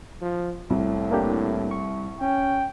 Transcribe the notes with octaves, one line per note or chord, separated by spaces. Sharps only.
F3
C2 A2
A#3 D4 G4
C#6
C#4 G5